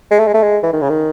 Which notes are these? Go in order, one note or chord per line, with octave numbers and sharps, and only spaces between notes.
G#3
A3
G#3
A3
G#3
E3
D#3
C#3
D#3